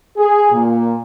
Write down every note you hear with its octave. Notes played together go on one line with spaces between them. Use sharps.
G#4
A#2